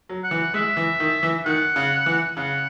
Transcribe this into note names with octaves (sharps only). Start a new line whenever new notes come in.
F#3
F#5
E3
G#3 E5
E3
D#3
E3
D#3 F#5
C#3
E3
C#3 F#5